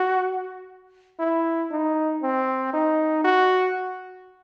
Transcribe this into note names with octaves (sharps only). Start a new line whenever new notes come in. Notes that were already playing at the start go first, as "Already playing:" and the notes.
Already playing: F#4
E4
D#4
C4
D#4
F#4